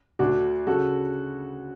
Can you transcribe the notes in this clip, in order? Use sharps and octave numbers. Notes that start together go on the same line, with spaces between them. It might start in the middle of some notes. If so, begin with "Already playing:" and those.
D2 D3 D4 F#4
C#3 F#4 A4